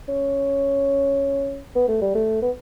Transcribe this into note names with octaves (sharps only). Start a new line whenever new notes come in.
C#4
B3
A3
G3
A3
B3